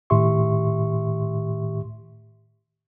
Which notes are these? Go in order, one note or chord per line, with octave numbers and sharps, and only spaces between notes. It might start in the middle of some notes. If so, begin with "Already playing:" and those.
A2 D#3 G4 E5 C6 C#6